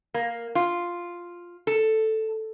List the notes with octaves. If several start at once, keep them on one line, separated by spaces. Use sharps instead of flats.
A#3
F4
A4